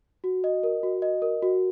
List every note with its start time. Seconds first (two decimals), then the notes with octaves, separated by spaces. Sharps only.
0.24 F#4
0.44 D#5
0.63 A#4
0.83 F#4
1.02 D#5
1.22 A#4
1.42 F#4